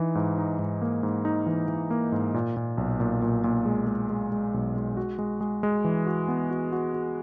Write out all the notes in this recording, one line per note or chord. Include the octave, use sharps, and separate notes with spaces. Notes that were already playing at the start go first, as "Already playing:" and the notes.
Already playing: E3 D#4
G#2
D#4
G#2
A#3
G#2
D#4
E3
E3
A#3
G#2
A#2
A#2
B1
A#2
A#2
A#2
G#3
G#3
G#3
G#3
B1
G#3
F#4
G#3
G#3
G#3
E3
F#4
B3
F#4
F#4
F#4